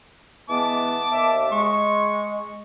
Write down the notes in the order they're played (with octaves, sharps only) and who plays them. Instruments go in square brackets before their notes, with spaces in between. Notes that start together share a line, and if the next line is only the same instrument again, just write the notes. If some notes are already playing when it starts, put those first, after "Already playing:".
[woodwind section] E3 G#3 B3 [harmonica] A5 D6
[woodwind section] D#2 E5
[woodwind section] G#3 [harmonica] C#6